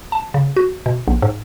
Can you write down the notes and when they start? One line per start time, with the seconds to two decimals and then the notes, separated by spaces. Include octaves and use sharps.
0.12 A5
0.34 C#3
0.56 F#4
0.86 B2
1.08 A#1
1.22 G#2